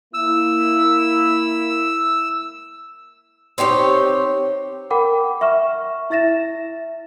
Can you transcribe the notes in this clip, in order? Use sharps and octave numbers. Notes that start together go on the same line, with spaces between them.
A#3 E4 E6
C4 D#4 G4 C#5
A#4 F#5 G5 B5 D6
E5 C#6 F6 E7
E4 E5 A6 A#6 E7